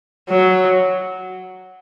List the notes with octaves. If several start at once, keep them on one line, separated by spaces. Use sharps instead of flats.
F#3